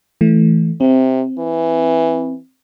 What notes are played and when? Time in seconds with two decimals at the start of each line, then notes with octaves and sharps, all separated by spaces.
0.21 E3 A3
0.81 C3 C4
1.39 E3